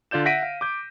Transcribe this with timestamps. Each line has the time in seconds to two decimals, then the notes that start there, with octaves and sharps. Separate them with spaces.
0.11 D3 F4 D5 G6 E7
0.25 E5 F#5 A#6 B6 D7 D#7
0.43 F5
0.61 D6 G6